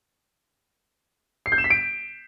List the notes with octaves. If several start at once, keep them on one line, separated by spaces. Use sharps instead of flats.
C7
G6
E7
B6
D7